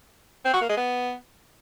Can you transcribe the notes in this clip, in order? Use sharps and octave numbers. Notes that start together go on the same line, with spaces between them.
C4
F#4
A#3
G#3
B3